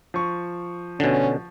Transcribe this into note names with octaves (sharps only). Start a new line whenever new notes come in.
F3 C#6
B2 D3 C#4